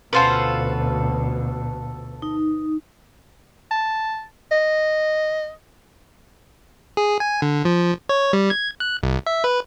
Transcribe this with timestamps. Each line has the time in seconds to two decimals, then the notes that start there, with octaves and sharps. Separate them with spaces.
0.13 D2 B2 C#4 F4 A4 B4 C5 F#5
2.22 D#4
3.71 A5
4.52 D#5
6.97 G#4
7.20 G#5
7.42 D3
7.65 F3
8.09 C#5
8.33 G3
8.50 G#6
8.80 F#6
9.03 C2
9.26 E5
9.44 B4